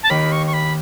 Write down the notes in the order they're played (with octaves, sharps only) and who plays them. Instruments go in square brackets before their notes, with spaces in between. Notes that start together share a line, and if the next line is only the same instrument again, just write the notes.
[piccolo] A5
[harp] D#2 D#3 [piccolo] B5
[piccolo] C#6
C#6
B5